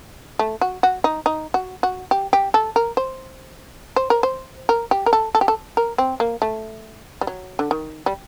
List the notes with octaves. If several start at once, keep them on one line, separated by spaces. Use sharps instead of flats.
A3
F#4
F#4
D#4
D#4
F#4
F#4
G4
G4
A4
A#4
C5
C5
A#4
C5
A#4
G4
A#4
A4
A4
G4
A4
A#4
C4
A#3
A3
G3
F#3
D3
D#3
G3